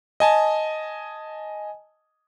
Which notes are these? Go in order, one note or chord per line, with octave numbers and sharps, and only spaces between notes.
D#5 G#5 A5